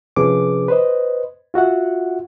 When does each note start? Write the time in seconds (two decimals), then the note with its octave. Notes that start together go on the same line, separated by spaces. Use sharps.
0.16 C3 F3 C#4 G#4 B4 D6
0.68 B4 C5 D#5
1.54 F4 F#4 E5 F#5